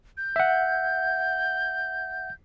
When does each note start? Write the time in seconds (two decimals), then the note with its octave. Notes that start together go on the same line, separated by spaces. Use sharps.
0.17 G6
0.36 E5 F#5